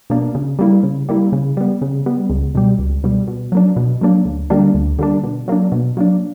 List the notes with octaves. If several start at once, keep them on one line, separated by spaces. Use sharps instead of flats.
B2 A#3 D4
C#3
G3 A#3 E4
C#3
G3 A#3 E4
C#3
G3 B3
C#3
G3 B3
C#2
B2 G3
C#2
B2 G3
B2
F#3 A#3 D4
B2
F#3 A#3 D4
D2
D3 G3 A#3 D4
D2
D3 G3 A#3 D4
B2
F#3 A#3 D4
B2
F#3 A#3 D4